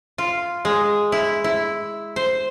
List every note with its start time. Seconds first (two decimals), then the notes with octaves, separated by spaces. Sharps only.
0.18 F4
0.65 G#3
1.12 E4
1.44 E4
2.16 C5